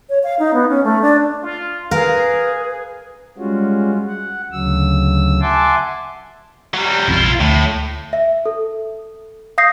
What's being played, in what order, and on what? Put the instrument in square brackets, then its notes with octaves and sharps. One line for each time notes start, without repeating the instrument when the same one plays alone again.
[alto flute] C#5
F5
D#4
B3
C#4
A3
D4
[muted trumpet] F4
[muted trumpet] G#4 [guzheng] A#4 [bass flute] B4 [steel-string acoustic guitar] F5
[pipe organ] G3 G#3 C#4 F4 F#4
F#5
D2 C#3 F#3 E6
E5 F#5 G#5 A5 C6 D6
[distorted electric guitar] F#3 G3
[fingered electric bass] A#1 F2 C3 [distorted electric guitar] E4 F4
[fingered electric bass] D2 [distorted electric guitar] A2
[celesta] E5
A4
F5 D#6 G6 A#6 C7